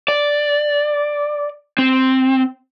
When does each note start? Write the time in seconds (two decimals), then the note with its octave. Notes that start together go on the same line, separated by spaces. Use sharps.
0.08 D5
1.79 C4